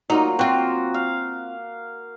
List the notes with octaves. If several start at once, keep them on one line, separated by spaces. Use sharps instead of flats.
F#3 A#3 D#4 F4
C4 F4 F#4
F5